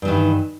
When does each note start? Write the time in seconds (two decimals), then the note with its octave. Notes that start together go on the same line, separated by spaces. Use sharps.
0.02 G2
0.05 E3
0.08 D#3